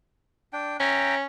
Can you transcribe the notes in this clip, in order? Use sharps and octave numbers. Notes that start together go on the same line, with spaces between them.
D4 G5
C#4 E5 G5 A#5